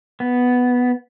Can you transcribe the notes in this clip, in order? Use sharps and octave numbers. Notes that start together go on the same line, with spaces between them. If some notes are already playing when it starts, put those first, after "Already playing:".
B3